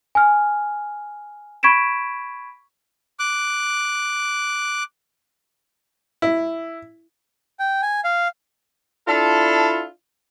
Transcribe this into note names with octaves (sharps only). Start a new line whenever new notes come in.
G#5 F6
B5 C#6 G#6 B6 D7 E7
D6 F#6
E4
G5
G#5
F5
D4 E4 F4 A4